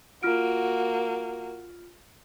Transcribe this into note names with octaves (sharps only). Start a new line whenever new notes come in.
A#3 F4 F#4 F6 D7